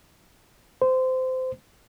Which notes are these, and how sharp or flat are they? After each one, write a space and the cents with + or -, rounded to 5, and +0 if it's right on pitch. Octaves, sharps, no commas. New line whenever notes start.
C5 -20